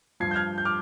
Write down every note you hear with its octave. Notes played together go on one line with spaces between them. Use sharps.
G2 F3 G#6 C7
G6
F6 G#6
G6
D6 F6